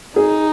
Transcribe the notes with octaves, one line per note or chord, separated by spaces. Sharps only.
D#4 G#4